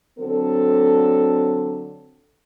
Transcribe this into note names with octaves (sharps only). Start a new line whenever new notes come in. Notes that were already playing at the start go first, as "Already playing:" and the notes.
D3 F#3 C4 A4